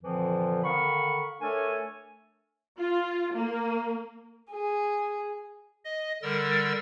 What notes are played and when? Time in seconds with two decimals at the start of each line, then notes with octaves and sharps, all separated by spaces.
0.03 F2 A#2 D3 E3 F3
0.63 D3 D#3 F5 B5 C#6
1.41 A3 D4 A4 A#4 C#5 G#5
2.78 F4
3.34 A#3
4.52 G#4
5.85 D#5
6.23 D3 G3 A#4 E6 A6